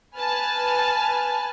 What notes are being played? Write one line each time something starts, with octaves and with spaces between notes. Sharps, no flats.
B4 G#5 A5 F6